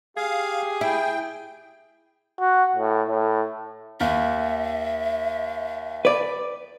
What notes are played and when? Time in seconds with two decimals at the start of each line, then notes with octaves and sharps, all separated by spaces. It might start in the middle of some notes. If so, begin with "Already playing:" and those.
0.17 G4 G#4 F5
0.81 E4 G5
2.40 F#4
2.76 A2
3.08 A2
4.00 D#2 E5
6.05 B4 D5